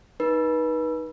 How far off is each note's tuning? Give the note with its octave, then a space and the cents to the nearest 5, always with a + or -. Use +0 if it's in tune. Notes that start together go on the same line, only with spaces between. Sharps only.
D#4 +0 B4 -30